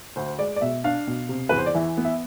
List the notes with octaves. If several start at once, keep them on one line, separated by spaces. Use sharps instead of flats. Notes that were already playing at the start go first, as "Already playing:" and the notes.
D2 C5
G#3 D5
D5
B2 E5
D4 F5
B2
C3
E2 B4
C5
D5
E3 E5
B3
E5